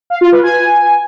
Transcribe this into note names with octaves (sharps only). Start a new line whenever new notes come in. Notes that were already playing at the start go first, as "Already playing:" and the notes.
F5
F4
B4
G#5